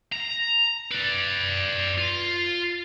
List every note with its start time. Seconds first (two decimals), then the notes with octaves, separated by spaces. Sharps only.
0.12 A#5
0.91 B4 D5
1.98 F4